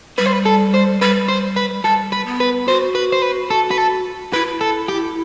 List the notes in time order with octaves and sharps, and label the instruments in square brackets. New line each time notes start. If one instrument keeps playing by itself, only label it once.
[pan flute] G3 [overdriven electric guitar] B4
[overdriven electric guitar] C5
B4
A4
C5
[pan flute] G3 [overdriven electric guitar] B4
[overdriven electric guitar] C5
B4
[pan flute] G3 [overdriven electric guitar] A4
[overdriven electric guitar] B4
[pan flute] B3
[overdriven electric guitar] B4
[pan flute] F#4 [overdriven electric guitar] C5
[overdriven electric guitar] B4
C5
B4
A4
B4
A4
[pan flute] E4 [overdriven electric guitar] B4
[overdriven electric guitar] A4
G4